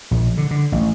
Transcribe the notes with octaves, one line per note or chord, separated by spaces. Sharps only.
A#1
D3
D3
A1